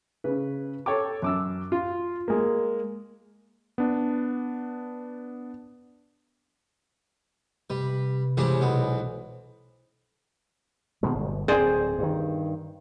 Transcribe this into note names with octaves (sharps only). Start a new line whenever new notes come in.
C#3 B4
A4 C#5 G5 D6
F#2 D6 E6
F4
G#3 A#3
B3 D4
C3 G3 B4
C#3 E3 G3 G#3 C4 G4
B1 B3
B2 D#3 G#3
G1
D1 C4 G#4 C5 D5
G2 D#3